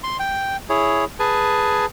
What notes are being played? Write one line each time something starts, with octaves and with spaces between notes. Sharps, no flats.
C6
G5
E4 G#4 C#5
G#4 B4 G#5 A5